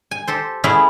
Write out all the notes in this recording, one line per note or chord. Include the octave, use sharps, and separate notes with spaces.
G#5
G4 A4 C5
A3 B3 C#4 E4 G#4